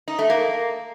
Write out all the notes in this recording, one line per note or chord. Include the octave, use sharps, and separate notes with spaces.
D#4
A3
A#3